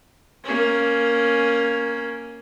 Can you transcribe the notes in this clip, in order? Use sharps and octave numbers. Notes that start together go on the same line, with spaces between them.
A#3 C#4